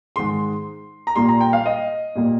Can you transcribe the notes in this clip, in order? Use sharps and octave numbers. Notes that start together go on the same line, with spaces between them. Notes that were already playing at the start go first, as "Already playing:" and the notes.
G#2 D#3 G#3 C6
A#5
A#2 G3 A#3 C6
A#5
G5
F5
D#5
A#2 G3 A#3